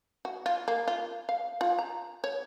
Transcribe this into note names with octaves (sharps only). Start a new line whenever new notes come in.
F#4
F4
A#3
F4
F5
F4
A#5
C#5